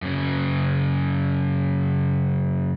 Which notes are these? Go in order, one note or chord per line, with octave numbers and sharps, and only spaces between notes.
F#2 C#3